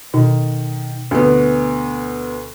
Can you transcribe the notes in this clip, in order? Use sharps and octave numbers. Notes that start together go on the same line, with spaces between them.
B2 D#3
D2 B3